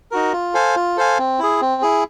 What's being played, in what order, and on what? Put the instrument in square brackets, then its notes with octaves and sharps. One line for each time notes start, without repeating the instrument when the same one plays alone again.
[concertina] D#4 F#4 A#4
F4
A4 C5 F5 G#5
F4
A4 C5 F5 G#5
C4
E4 G#4
C4
E4 G#4